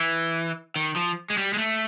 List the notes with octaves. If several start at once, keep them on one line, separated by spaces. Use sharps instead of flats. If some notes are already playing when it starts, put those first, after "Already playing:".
Already playing: E3
D#3
F3
G#3
G3
G#3
A3